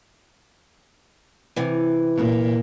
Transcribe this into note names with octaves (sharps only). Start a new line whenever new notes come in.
C3 E3
A#2